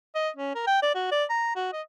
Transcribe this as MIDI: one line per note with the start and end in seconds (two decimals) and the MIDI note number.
0.15 0.29 75
0.37 0.54 61
0.55 0.67 70
0.67 0.78 79
0.82 0.95 74
0.95 1.10 66
1.12 1.25 74
1.30 1.51 82
1.56 1.69 66
1.73 1.82 75